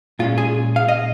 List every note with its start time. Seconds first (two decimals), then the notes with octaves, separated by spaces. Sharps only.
0.19 A#2 G#3 C#4 F4
0.38 G#4
0.76 F5
0.88 D#5